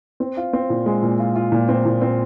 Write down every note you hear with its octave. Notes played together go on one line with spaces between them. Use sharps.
C4
F4
C4
A#2
G#3
A#2
F4
F4
A#2
C4
A#2
C4